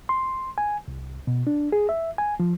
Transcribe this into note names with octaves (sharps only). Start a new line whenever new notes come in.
C6
G#5
C2
B2
D4
G#4
E5
G#5
F3